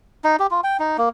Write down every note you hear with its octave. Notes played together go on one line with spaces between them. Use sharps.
D#4
G4
F4
G5
D#4
A#3